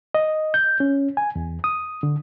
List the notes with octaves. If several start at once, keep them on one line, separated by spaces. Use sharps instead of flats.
D#5
G6
C#4
G#5
E2
D#6
D3